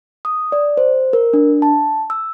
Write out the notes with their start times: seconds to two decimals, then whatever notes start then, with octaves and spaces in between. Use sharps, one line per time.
0.25 D#6
0.52 D5
0.77 C5
1.13 A#4
1.33 D4
1.62 A5
2.10 E6